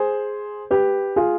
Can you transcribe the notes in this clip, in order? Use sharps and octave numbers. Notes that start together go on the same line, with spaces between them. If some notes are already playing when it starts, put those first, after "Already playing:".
Already playing: G#4 C5
G4 B4
F4 G#4